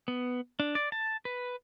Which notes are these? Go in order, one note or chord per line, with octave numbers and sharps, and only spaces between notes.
B3
D4
D5
A5
B4